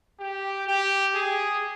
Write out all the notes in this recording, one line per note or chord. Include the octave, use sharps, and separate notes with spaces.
G4
G4
G#4